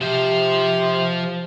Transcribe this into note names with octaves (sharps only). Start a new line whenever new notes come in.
C3 F3 C5